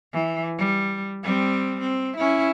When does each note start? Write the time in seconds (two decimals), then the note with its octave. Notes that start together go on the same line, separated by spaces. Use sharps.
0.13 E3
0.58 G3
1.23 G3 C4
1.81 C4
2.17 C#4 E4